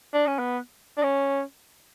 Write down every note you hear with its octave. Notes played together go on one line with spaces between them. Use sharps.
D4
C#4
B3
D4
C#4